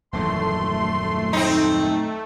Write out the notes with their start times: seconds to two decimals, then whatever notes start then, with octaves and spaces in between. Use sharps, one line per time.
0.13 D#1 F#2 E3 A3 C6
1.33 C4 D#4